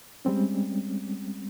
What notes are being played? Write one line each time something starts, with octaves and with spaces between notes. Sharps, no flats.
G3 G#3 C4 C#4